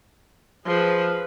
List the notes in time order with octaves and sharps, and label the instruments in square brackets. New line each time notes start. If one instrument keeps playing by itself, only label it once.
[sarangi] F3 [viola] G#4 B4